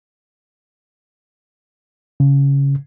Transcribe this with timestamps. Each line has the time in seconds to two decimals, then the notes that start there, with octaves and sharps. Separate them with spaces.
2.20 C#3